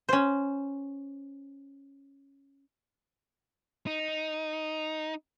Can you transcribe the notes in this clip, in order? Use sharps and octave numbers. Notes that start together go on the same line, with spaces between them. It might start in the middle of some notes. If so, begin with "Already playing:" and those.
C#4 C5
D#4